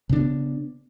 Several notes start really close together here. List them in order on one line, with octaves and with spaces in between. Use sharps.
C#3 D4 B3